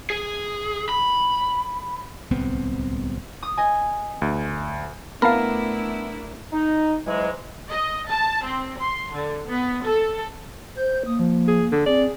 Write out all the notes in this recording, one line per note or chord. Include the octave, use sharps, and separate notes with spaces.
G#4
B5
D1 C2 B3 C4
D#6
D#5 G#5
D2
A3 B3 D4 E4 A#4 F5 A5 B5
D#4
G#2 E3 F#3 G#3
D#5
A5
C4
C6
D3
B3
A4
C5 G6
A#3 D#6
F3
G#4
D3 A4
C4 G#4 D5